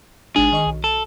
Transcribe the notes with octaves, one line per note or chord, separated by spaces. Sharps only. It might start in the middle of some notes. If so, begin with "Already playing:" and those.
G#1 G#3 D4 G#4
D#3 D#5 C#6
B1
A4